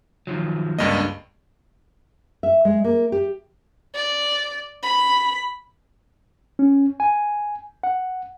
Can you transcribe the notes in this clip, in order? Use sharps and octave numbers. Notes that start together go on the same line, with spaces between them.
D#3 F3 F#3
C#2 G2 A#3 D4 A4 D#5
E5
G#3
A#3
G4
D5
B5
C#4
G#5
F#5